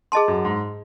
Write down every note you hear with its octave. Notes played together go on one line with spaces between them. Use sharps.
G#4 D#5 A5 C6
F#2
G#2